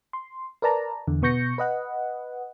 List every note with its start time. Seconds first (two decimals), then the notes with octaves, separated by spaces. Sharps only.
0.13 C6
0.62 A#4 B4 D5 A5 A#5
1.07 E2 D3
1.22 B2 B3 C#6 G6 A#6 C#7
1.58 B4 D#5 F#5